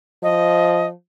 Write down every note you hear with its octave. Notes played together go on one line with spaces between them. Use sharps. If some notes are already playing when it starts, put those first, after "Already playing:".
F3 D#5